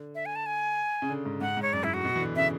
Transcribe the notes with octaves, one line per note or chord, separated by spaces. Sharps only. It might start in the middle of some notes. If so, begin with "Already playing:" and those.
Already playing: D3
E5
G#5
A5
G#5
C#3
D3
G#2
G#2 F#5
G#2
C#5
F#2 D5
G#2 E4
A2 F#4
B2
E3
D3
C#3 E5